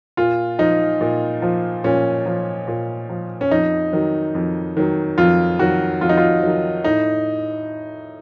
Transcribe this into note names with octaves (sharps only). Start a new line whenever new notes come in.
A#2 F4
F3 D#4
A#2
F3
A#2 C#4
F3
A#2
F3
C#4
F2 D#4
D#3 F#3
F2
D#3 F#3
F2 F4
D#3 F#3 F#4
F2 F4
D#4
F4
D#3 F#3
A2 D#4